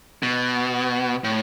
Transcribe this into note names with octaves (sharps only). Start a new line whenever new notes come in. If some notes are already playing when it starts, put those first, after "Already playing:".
B2
A2